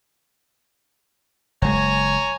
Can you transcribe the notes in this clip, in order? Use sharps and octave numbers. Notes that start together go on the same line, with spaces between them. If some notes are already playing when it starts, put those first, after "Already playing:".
F#1 G#3 C#5 G#5 A#5